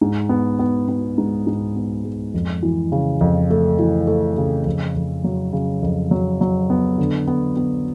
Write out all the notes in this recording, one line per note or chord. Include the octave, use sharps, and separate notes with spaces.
G#2
B3
B3
B3
G#2
G#2
B3
G#3
F2
E3
C#3
F2
A3
E3
A3
C#3
F2
F2
F#3
C#3
F2
F#3
F#3
B3
D3
B3
B3